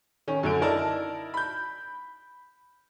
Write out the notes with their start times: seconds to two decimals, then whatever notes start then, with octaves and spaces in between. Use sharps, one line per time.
0.28 D#3 C#4
0.43 F#2 D3 D7
0.61 D#4 E4 A#4 D5 A5
1.34 B5 G6